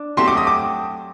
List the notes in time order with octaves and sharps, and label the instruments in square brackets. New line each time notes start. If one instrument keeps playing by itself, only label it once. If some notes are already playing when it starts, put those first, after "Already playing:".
Already playing: [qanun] D4
[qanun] F#3 A3 C4 G4 [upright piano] C6
[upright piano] D6
D#6
D6